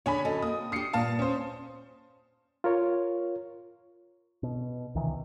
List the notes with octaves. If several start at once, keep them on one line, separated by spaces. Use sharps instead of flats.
D3 D4 G#4 C#5 G#5 B5
F#2 A4 D#5
A#3 C4 D#6
D4 G4 D#6 C7 C#7
G2 A#2 A#3 F5 A5
C#4 C5
F4 A#4 C#5
B2
C#2 C3 D#3 E3